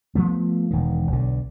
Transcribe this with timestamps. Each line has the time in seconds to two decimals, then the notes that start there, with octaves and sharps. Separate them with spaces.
0.15 F3 A3 B3
0.71 E1 D#3
1.11 B1 D3